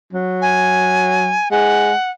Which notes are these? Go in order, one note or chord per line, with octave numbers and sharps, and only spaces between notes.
F#3
G#5
G#3 F#5